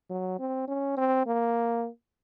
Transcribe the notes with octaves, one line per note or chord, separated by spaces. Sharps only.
F#3
C4
C#4
C4
A#3